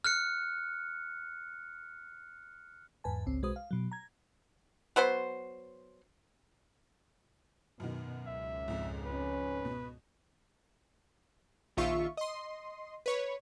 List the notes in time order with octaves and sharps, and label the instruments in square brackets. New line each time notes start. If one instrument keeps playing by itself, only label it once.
[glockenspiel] F6 F#6 C#7
[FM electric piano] E2 G#2 B4 G#5 A5
G#1 C#2 C4
B1 G#3 F#4 B4 C5 D#6
F5
B2 F#3
A#5 G#6
[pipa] F#3 B3 C5 C6
[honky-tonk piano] F#2 D#3 [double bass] B2
[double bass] C#2 [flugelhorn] E5
[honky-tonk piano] F2 G#2
[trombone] C#4 [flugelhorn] B4
[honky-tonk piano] B2
[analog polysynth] A#1 D#3 F4 E5 C#6
D#5 C6
B4 C#5